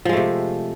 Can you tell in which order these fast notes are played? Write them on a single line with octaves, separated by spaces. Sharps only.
F3 G#3 A3 C3